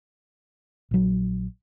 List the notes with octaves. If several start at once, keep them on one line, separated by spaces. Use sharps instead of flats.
A#1 F#3